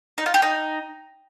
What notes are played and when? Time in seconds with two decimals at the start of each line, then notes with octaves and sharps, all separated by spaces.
0.18 D#4
0.26 F4
0.34 G4
0.42 D#4